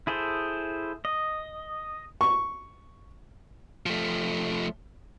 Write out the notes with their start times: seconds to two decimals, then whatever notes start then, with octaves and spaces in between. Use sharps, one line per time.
0.07 E4 G#4 A4 C5
1.05 D#5
2.21 C#6
3.86 F3 A3